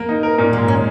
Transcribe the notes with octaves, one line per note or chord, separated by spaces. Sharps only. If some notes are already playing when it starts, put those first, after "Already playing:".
Already playing: A#3 A#4
D#4
A#4
A#2
G#2 A#3
C#4